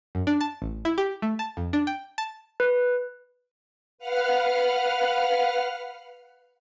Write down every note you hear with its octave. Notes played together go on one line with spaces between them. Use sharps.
F#2
D4
A5
A1
E4
G4
A3
A5
F2
D4
G5
A5
B4
B4 F5 F#5 F6